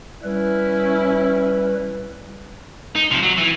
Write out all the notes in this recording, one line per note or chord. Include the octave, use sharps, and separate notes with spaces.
G3 C#4 E4 B4
D#4
C3 F3
F#3
E3